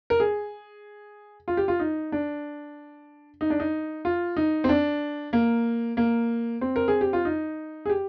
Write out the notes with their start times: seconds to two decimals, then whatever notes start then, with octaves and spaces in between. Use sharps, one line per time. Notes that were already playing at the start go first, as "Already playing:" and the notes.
0.10 A#4
0.20 G#4
1.48 F4
1.57 G4
1.68 F4
1.80 D#4
2.12 D4
3.41 D#4
3.50 D4
3.60 D#4
4.05 F4
4.37 D#4
4.64 C4
4.69 D4
5.33 A#3
5.97 A#3
6.61 C4
6.76 A#4
6.88 G#4
7.01 G4
7.13 F4
7.25 D#4
7.86 G#4
7.90 G4